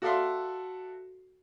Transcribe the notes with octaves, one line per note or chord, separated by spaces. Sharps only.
F#4 A4 D5 E5 F5 C6